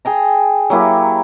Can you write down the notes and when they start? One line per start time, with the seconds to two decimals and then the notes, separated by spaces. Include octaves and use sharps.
0.05 G#4 G5 A#5
0.70 F#3 A#3 E4 G4